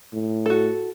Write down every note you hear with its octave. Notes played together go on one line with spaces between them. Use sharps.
A2
F#4 A4